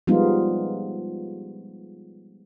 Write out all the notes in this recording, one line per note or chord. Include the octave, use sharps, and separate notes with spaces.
F3 G3 G#3 B3 D#4 F4